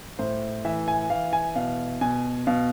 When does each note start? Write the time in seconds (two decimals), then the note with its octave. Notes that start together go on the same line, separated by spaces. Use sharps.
0.19 A2 C5
0.65 E3 E5
0.88 G#5
1.10 E3 F5
1.33 G#5
1.56 B2 F5
2.01 B2 G#5
2.47 B2 F5